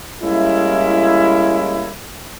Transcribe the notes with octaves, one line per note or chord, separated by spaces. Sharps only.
G3 G#3 A#3 C#4 E4